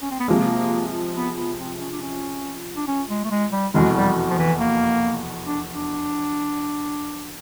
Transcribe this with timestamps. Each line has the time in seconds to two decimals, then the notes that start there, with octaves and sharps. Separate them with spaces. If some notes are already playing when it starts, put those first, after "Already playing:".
0.02 C#4
0.11 C4
0.20 B3
0.28 C3 F3 G#3 A#3
1.15 B3
1.36 B3
1.58 C4
1.79 C#4
1.91 D4
2.01 C#4
2.76 D4
2.87 C#4
3.09 G#3
3.24 A3
3.31 G#3
3.52 G3
3.74 F1 E2 B2 G#3
3.95 G3
4.30 F3
4.38 E3
4.60 A#3
5.47 D4
5.73 D4